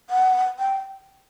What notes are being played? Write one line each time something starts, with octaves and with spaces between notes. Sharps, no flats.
F#5
G5